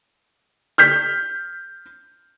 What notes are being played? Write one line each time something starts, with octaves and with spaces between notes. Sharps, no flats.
F6 G6 B6